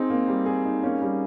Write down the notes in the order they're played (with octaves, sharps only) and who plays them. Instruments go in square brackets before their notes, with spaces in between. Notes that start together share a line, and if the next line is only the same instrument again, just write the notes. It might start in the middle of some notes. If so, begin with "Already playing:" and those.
Already playing: [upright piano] C4 [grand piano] D#4 G#4
[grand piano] A#3
G3
G#4
D#4
[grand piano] A#3 [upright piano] C#4
[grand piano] G3